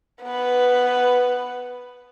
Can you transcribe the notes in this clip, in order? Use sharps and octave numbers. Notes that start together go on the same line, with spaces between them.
B3 B4